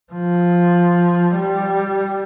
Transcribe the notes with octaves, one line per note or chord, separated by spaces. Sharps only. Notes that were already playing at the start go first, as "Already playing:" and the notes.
F3
G3